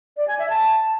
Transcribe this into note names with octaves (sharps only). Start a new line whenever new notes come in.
D5
G#5
E5
A5